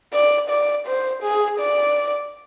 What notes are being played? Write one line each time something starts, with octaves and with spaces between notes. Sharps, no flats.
D5
D5
C5
G#4
D5